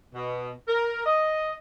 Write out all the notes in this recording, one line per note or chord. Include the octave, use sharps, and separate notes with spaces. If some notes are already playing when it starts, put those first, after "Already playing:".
B2
A#4
D#5